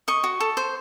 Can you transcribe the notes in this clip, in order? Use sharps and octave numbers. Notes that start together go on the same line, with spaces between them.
D#5 C#6
F#4
A4
C5